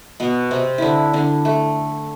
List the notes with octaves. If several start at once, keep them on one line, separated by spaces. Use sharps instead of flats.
B2 B3
C3 C4
D3 D4 E4
D3 D4
A3